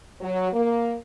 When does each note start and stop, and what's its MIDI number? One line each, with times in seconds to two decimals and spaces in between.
0.21 0.53 54
0.53 0.94 58